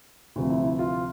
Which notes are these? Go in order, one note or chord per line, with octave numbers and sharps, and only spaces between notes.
D2 C3 F3
E4
E4
F4